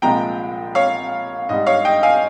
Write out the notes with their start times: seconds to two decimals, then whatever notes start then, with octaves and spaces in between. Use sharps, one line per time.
0.02 C2 A#2 F3 G#3 G5 A#5
0.75 C#5 F5
1.49 G#2 G3 D#5
1.67 C#5 F5
1.85 D#5 G5
2.03 F5 G#5